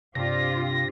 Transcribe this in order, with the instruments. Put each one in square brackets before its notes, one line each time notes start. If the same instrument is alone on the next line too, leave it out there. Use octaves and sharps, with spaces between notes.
[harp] G2 [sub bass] C3 [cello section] C4 F4 G4 [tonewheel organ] A#6